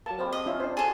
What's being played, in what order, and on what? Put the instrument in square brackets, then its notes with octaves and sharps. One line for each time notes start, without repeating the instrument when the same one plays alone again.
[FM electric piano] F#3 A#3 [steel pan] A5
[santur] F3 G3 G#3 [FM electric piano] C4
[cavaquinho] D#5
[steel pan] C#4 F4 E5
D4 C5
[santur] F#4 C#5 [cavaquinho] G#4 A4 [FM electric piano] A5